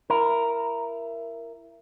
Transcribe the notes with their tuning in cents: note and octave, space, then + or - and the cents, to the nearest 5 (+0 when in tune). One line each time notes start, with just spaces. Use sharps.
E4 +20 A#4 +0